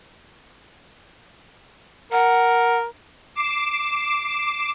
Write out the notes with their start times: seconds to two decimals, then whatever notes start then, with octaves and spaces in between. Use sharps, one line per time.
2.12 A#4 F#5
3.35 D6 C7 E7